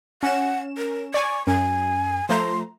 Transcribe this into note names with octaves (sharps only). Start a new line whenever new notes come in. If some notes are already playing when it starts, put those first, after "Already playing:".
C#4 F#5 E7
A#4
D5 G#5 C#6
F#2 G#5
F3 A3 A#5 C6